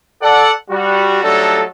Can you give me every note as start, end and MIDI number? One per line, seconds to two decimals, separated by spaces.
0.22 0.51 69
0.22 0.51 74
0.22 0.51 78
0.70 1.20 55
0.70 1.20 66
1.24 1.63 54
1.24 1.63 55
1.24 1.63 57
1.24 1.63 62
1.24 1.63 63
1.24 1.63 69